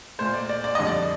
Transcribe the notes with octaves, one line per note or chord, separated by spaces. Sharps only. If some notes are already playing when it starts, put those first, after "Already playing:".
A#2 A3 C5
D5
D5
D5
F2 D3 G3 D#5
D5